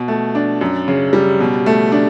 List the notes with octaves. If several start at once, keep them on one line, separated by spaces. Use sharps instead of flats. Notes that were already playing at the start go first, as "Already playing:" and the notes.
Already playing: B2
A3
D4
F#2
C#3
G3
B2
A3
D4